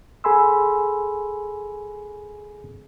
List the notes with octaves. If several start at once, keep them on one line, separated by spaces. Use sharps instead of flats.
G#4 A4 G#5 B5 C6 E6